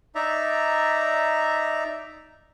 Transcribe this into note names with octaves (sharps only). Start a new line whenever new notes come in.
D#4 D5 E5 A#5